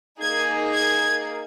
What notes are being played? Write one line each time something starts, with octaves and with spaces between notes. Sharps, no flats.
A#3 D#4 G#4 G#6
G#6